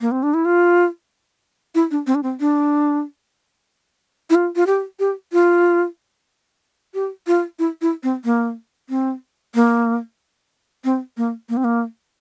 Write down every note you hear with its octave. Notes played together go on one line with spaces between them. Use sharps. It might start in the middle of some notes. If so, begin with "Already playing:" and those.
A#3
C4
D4
E4
F4
E4
D4
C4
D4
C4
D4
E4
F4
F4
G4
G4
F4
G4
F4
E4
E4
C4
A#3
C4
A#3
C4
A#3
A#3
C4
A#3